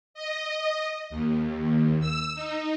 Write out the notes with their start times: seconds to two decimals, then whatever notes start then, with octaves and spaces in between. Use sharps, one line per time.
0.14 D#5
1.10 D#2
2.00 E6
2.35 D#4